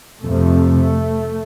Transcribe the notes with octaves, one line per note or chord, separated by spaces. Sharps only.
F2 C3 A3